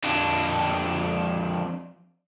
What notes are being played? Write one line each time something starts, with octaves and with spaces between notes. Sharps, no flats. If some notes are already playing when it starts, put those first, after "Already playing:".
F2 D4